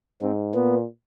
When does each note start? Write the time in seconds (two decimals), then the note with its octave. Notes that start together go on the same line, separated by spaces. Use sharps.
0.21 G#2 C4
0.55 A#2 B3